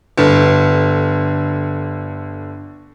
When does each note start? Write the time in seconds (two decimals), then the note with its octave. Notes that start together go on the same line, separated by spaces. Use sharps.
0.18 G1 D3